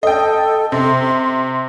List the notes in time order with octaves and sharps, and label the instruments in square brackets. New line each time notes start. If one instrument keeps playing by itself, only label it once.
[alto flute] A4 [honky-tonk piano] D#5 G5
[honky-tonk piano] C3 [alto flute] C6